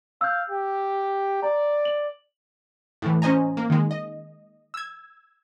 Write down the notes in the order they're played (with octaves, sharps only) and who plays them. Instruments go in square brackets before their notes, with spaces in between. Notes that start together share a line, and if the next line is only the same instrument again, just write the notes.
[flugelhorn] F5 [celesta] E6 G6
[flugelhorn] G4
[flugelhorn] D5 [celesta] A#5
[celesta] F#7
[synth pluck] A2 E3
C#4 C5 D#5 G#5 A#5
A#3
D#3 G#3
D#5
E6 G#6